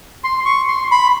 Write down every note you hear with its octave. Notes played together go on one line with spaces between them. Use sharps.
C6
C#6
C6
B5